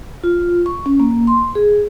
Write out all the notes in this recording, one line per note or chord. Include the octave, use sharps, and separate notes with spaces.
F4
C#6
C#4
A#3
C6
G#4